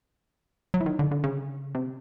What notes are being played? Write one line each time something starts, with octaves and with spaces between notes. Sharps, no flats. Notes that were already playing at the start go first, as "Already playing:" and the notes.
F#3
E3
D#3
D3
D3
C#3
C3